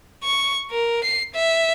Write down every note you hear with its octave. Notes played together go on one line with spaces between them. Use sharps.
C#6
A#4
C7
E5